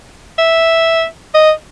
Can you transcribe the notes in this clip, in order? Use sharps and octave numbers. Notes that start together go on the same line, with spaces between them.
E5
D#5